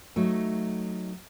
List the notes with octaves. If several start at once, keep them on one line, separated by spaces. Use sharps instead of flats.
F#3 A3 D#4